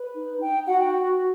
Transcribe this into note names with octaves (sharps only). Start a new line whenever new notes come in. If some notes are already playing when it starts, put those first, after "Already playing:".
Already playing: B4
D#4
D#4 G5
F#4 F#5
G5